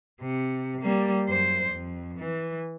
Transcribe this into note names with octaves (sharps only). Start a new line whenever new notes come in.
C3
G3 A#3
F#2 C5
F2
E3